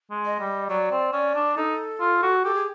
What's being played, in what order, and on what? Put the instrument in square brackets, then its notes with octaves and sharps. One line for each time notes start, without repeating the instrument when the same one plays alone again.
[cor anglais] G#3
[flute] D#5
[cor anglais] G3
[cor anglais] F#3 [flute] D5
[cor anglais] C4
[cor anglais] C#4 [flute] D5
[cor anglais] D4
[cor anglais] D#4 [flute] A4
[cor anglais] F4
F#4
[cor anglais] G4 [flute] A4
[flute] G#4